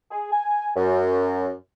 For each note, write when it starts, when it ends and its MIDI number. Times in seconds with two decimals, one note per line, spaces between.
0.11 0.28 68
0.32 0.70 80
0.76 1.51 42